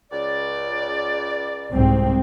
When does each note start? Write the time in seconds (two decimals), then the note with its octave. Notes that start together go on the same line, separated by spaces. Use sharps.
0.12 C#2 D5
1.73 C2 G#2 C4